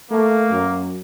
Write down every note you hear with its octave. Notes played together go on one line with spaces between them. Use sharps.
A3 A#3
F#2